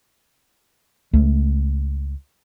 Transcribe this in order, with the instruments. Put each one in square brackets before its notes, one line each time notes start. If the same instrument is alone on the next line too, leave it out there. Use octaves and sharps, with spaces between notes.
[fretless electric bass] C#2 A3